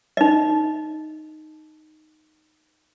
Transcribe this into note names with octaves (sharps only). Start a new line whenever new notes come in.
D#4 D#5